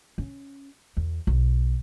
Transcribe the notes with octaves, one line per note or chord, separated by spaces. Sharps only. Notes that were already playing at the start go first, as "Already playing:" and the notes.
C#4
E2
B1